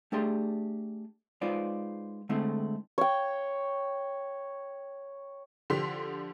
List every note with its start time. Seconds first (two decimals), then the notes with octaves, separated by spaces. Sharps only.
0.12 A3 D4 G4 G#4 D5 C6
1.42 G#3 D#4 F4 B4 C5 D5
2.29 D3 G#3 A3 C4 E4
2.98 C#5 G5
5.70 D3 F3 G4 C6 B6